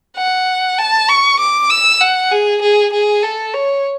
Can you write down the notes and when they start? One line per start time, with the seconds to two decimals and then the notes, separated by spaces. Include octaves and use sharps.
0.17 F#5
0.78 A5
1.08 C#6
1.39 D6
1.70 E6
2.01 F#5
2.31 G#4
2.61 G#4
2.93 G#4
3.23 A4
3.54 C#5